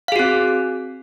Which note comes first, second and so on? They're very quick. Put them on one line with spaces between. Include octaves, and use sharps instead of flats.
F5 G#4 F#4 C4